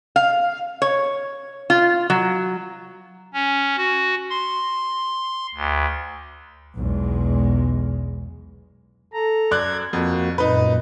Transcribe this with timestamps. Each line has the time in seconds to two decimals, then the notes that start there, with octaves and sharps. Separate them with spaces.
0.16 F5
0.82 C#5
1.70 F4
2.10 F#3
3.34 C#4
3.77 F#4
4.30 C6
5.55 D2
6.77 B1 E2 G#3
9.13 A4 A#5
9.51 F#2 D5 F#6 G#6
9.93 F2 A#3 F#4
10.38 F#2 A#2 D#4 B4